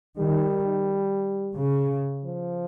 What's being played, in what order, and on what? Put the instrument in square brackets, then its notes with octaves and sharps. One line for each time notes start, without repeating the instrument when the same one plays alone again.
[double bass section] D#3 [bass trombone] G3
[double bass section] C#3
[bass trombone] F3